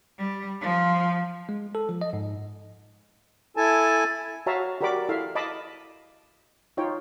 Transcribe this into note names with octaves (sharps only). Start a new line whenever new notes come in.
G3
F3
G#3
A4
F3
D#5
G#2
E4 A4 G#5 A5
F#4 C#5 E5 F5 A5 A#5
F#4 G4 A#4 D5 B5 D6
E4 A4 E5 F5
D#5 F5 A5 B5 D6
D#4 F4 C#5 G5